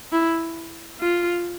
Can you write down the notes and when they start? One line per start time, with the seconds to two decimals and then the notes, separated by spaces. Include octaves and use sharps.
0.12 E4
1.01 F4